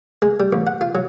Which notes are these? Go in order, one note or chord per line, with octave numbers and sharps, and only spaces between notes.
G#3
G3
A1
F#5
F4
F#3